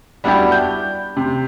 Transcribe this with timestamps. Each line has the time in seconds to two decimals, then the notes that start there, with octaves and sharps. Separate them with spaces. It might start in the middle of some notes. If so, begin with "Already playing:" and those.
0.24 G3 B3 D4 E4 F#4 G4
0.52 G6
1.17 C3